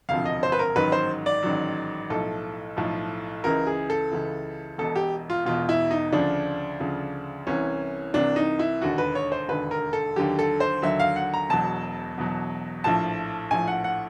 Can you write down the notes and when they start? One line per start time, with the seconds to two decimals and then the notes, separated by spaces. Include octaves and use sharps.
0.09 E1 D2 C3 F3 F5
0.26 D#5
0.43 C5
0.52 B4
0.59 A#4
0.76 A1 G#2 D#3 F#3 B4
0.92 C5
1.26 D5
1.43 A1 G#2 D#3 F#3
2.10 B1 A2 F3 A4
2.77 B1 A2 F3
3.44 C#2 C#3 E3 A#4
3.67 G#4
3.90 A4
4.11 C#2 C#3 E3
4.78 E1 E2 B2 A4
4.96 G4
5.30 F4
5.45 E1 E2 B2 F4
5.69 E4
5.91 D#4
6.13 D2 C#3 F3 D4
6.80 D2 C#3 F3
7.47 C2 C3 E3 C#4
8.14 C2 C3 E3 D4
8.36 D#4
8.59 E4
8.81 E1 D#2 D3 F#4
8.98 B4
9.15 C#5
9.32 C5
9.48 E1 D#2 D3 B4
9.71 A#4
9.93 A4
10.16 D#2 D3 F#3 G4
10.39 A4
10.60 C5
10.82 D#2 D3 F#3 E5
11.00 F5
11.16 F#5
11.34 A#5
11.50 E1 E2 B2 F#3 A5
12.18 E1 E2 B2 F#3
12.84 A#1 A2 F3 A5
13.51 A#1 A2 F3 G#5
13.68 F#5
13.84 F#5